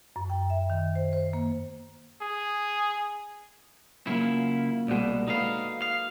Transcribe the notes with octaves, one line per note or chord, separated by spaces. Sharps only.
F#2
G5
E5
D#3
C5
C5
A#3
G#4
C#3 F#3 A#3 E4 F4
C2 B2 G#3 F#4 D5
D#4 E4 A4 B4 F5
F5 D#6